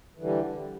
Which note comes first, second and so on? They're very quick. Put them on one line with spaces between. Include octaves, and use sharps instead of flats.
E3 D3 G3